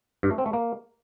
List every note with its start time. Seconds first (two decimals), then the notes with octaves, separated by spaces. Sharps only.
0.23 G2
0.31 A3
0.38 C4
0.46 A3
0.53 A#3